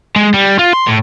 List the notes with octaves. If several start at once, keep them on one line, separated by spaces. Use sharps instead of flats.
G#3
G3
F4
C6
A2